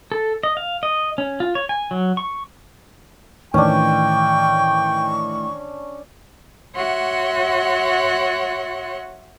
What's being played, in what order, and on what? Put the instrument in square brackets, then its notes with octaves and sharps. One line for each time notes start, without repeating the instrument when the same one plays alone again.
[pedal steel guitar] A4
D#5
F5
D#5
C#4
F4
C#5
G#5
F#3
C#6
[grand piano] A2 D#3 E3 [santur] C#4 D4 [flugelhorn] G5 [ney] C#6
[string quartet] F#4 C#5 E5 F#5 C6